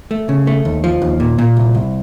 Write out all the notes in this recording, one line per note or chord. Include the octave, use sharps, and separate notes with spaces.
A3
C#3
A3
D#2
F3
D#2
A#2
A#2
C2
C2